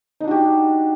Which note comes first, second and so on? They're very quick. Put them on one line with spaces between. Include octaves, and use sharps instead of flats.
D#4 D4 F#4 G4